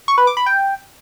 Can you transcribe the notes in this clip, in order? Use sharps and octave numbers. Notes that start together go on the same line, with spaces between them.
C#6
B4
D6
B5
G5